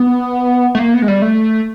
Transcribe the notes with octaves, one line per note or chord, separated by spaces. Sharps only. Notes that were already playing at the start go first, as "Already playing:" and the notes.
Already playing: B3
A3
A#3
B3
G#3
G3
A3